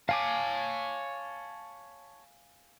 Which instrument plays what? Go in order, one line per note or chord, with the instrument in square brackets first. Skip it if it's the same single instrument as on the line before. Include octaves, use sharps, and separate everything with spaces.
[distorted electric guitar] C#5 A5 [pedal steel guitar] F5 G#5 D6